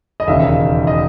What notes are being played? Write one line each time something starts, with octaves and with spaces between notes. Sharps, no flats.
D#5
E1 D#2 C#3 E5
D#5